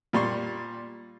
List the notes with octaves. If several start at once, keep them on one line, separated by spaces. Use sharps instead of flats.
A#2 G3 C6 C#6